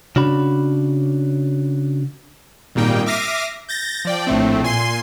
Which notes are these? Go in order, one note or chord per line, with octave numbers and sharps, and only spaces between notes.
C#3 D4 F#4 B5
G#1 A#2 G3 A#3 D#4 G5
E5 D6 F6 A#6 C7 D#7
G6 A6 A#6
F3 D5 G5
A#1 A2 A3 C4
A#2 G#5 C6 C7